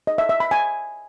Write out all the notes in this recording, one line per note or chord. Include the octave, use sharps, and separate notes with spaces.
D#5
E5
E5
B5
G#5